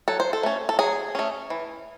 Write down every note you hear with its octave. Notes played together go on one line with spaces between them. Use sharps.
F#3 A4
C5
A4
A3 C#4
A4
F#3 G#4
A3 C#4
E3